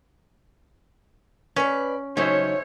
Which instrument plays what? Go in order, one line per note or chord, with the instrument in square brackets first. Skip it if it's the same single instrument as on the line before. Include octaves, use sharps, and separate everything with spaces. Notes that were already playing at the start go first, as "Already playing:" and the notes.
[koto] C#4 [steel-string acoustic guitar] B4 D5
[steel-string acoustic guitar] C#3 F#3 D#4 [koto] C#4 [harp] A4 C5 E5 [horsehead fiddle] C#5